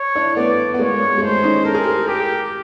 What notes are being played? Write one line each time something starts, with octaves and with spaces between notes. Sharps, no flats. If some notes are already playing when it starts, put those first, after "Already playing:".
Already playing: C#5
D4 E4
A3 B3 D5
B3
G#3 A#3 C#5
G#3
G#3
A3 C5
C#4 D#4
A4 A#4
G#4
G4 A4
G4 G#4 A#4